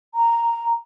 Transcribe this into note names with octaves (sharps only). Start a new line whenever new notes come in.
A#5